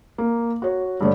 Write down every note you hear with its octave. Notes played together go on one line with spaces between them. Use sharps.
A#3
F#4 C#5
G2 D3 A3 C#5